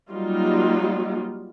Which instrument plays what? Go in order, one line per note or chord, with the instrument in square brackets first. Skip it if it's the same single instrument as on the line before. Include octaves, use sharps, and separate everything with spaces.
[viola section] F#3 G3 A#3 D#4 F4